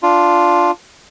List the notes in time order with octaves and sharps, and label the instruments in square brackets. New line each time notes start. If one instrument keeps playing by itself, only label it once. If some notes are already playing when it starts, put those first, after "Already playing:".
[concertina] D4 F4